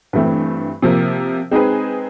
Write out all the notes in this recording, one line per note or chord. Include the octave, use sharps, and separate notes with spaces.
G2 E3 A3 C4 E4
C3 F3 A#3
G#3 C4 D#4 G#4 B4